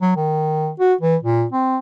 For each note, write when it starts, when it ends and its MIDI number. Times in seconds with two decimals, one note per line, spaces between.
0.02 0.14 54
0.16 0.70 51
0.79 0.94 66
1.01 1.16 52
1.23 1.45 46
1.52 1.78 60